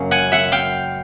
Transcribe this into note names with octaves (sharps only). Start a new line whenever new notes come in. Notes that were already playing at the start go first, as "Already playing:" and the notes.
Already playing: F#2 C#3 A#3 C#4
F#5 G#5
E5 F#5
F5 G5